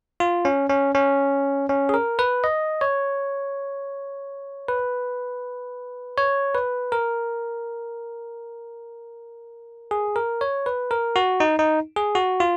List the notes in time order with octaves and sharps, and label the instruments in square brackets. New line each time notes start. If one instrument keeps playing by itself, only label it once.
[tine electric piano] F4
C#4
C#4
C#4
C#4
G#4
A#4
B4
D#5
C#5
B4
C#5
B4
A#4
G#4
A#4
C#5
B4
A#4
F#4
D#4
D#4
G#4
F#4
F4